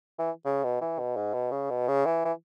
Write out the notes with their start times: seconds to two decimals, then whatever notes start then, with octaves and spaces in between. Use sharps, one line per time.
0.19 E3
0.45 C#3
0.64 B2
0.81 E3
0.99 B2
1.17 G#2
1.34 B2
1.51 C#3
1.70 B2
1.88 C#3
2.05 E3
2.25 E3